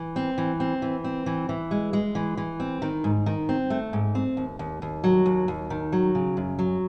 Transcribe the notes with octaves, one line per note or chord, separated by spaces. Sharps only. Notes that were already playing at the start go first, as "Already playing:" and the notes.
Already playing: E3
C4
E3
C4
E3
C4
E3
E3
G#3
G#3
E3
E3
C4
D#3
G#2
D#3
C4
A3
G#2
C4
D#2
D#2
D#2
F#3
D#2
D#2
D#3
F#3
C#3
F#2
F#3